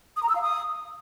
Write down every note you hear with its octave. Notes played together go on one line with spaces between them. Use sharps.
D#6
A#5
E6
F5
D#6